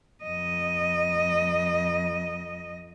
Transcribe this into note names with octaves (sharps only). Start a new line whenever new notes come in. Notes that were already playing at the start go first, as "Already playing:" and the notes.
F2 D#5